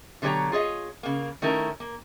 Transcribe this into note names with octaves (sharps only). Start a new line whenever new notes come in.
B2 D3 F#3 G4 C#5 A#5
F4 G#4 C#5 D#5
C#3 A#3
D#3 A3 C#4 E4 A#4
A#3